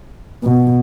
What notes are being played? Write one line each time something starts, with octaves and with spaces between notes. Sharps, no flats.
B2